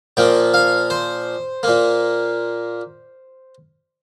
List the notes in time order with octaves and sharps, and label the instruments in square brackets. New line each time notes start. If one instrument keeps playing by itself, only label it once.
[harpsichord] A#2 F3 A#3 G5
F5
C5
A#2 A#3